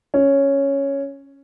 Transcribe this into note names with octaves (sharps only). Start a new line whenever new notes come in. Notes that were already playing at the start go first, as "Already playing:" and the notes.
C#4